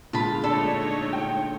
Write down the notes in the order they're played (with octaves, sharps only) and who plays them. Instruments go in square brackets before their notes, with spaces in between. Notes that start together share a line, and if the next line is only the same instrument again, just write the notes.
[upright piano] A#2 D3 G#3 [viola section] F4 [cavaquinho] A5 B5
[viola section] A3 D#4 C#5 [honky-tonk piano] D4 [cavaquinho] A4
[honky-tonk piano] G5